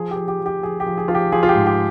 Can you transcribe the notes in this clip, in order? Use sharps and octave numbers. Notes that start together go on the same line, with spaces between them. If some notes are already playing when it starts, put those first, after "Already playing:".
Already playing: F3 G#4
G4
F3
G4
F3
G4
F3 G#4
G4
F3
G#4
F3 F4
G4
F3 G#4
F4
G4
G#2
G4